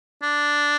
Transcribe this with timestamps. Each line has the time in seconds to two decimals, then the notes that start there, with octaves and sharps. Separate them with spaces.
0.23 D4